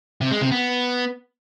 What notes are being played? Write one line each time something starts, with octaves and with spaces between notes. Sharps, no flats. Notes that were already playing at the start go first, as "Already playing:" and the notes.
C3
G#3
C3
B3